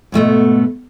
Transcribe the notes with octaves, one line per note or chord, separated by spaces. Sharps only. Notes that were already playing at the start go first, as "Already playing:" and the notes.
G#2 B2 A3 B3